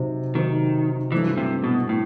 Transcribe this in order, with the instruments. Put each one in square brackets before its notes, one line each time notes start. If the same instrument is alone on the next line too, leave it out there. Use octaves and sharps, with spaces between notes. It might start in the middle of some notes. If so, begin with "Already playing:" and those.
Already playing: [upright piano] C3 F#3 C4 D#4
[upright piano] C3 F#3 C4 D#4 [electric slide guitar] D#3
[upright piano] G2 F#3 A3 C4 E4 [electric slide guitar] E3
[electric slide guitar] C3
B2
[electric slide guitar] A2 [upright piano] E4